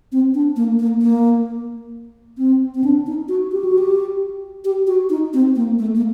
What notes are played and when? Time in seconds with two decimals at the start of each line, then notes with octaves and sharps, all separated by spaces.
0.12 C4
0.34 D4
0.56 A#3
0.79 A#3
1.02 A#3
2.38 C4
2.75 C4
2.84 D4
3.07 D#4
3.28 F#4
3.52 G4
3.65 F#4
3.78 G4
4.65 G4
4.87 F#4
5.10 D#4
5.34 C4
5.56 A#3
5.79 A3
5.96 A#3